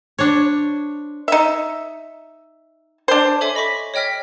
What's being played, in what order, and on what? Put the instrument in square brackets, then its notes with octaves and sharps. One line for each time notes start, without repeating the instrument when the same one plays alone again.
[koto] D4 C5 C#5
[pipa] D#4 E5
D4 C5
[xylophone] A4 C#5 E5 G#5 D6
D#5 B5 C#6 D6 B6
C#5 D#5 G5 F6 B6